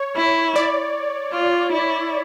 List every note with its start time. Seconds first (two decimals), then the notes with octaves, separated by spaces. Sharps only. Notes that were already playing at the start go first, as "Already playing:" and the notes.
Already playing: C#5
0.17 E4
0.56 D5
1.33 F4
1.72 E4